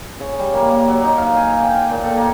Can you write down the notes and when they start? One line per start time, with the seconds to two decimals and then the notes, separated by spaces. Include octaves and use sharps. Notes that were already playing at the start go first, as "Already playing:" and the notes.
0.20 C#3
0.39 G3
0.54 A#3
0.71 A#3
0.88 F#3
1.04 D#4
1.18 F5
1.37 G#5
1.63 G5
1.91 A#2
2.04 A4
2.17 A#3